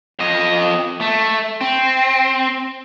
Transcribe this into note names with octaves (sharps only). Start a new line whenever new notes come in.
F2 D#5
A3
C4